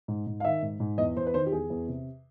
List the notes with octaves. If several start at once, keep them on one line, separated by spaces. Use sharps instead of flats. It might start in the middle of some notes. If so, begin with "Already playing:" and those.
G#2
G#2
F5
D#3 E5
G#2
G#2
E2 D#5
E2 C5
B4
D#3 C5
G4
E2 G#4
E2
C3